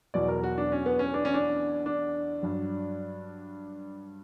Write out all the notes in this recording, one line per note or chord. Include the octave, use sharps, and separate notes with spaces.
E2 B2 F#3 D5
A#4
F#4
D4
C#4
B3
C#4
D4
C#4
D4
D4
G2 F#3